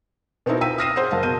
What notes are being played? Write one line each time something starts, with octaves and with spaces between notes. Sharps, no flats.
B2 B3 C4 D#4 E4 A#4
F4 G5 E6 B6 D#7
D#6 F6 A#6 C7 D#7 E7
G#4 C5 F#5
F#1 F5 A5
B2 G6 D#7